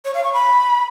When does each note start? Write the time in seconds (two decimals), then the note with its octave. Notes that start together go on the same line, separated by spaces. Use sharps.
0.05 C#5
0.14 F5
0.24 C#6
0.33 B5